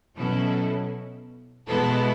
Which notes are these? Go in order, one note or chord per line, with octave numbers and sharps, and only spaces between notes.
B2 F#3 C#4 E4 A4
B2 G#3 B3 E4 A4